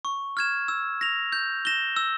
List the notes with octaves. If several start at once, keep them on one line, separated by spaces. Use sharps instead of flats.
C#6
F6 G#6 E7
E6
A#6 F7
G6
A#6 E7 G7
E6